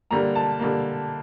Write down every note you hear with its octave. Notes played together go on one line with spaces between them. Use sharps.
D3 G3 A#3 A#5
A5
D3 G3 A#3